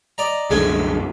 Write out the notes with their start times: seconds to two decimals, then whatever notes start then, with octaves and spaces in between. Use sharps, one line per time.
0.18 D5 D#5 A#5
0.50 C2 F#2 D3 G#3 A3 G#5